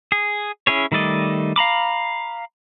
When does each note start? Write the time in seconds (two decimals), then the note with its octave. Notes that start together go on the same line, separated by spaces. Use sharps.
0.12 G#4
0.67 C#4 E4 G#4 C#5
0.92 D#3 G3 A3 D5 D#5
1.56 F5 A#5 B5 D6